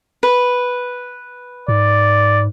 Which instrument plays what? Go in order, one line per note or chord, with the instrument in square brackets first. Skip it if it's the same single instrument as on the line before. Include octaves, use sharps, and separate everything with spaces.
[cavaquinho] B4
[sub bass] G#2 [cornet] D5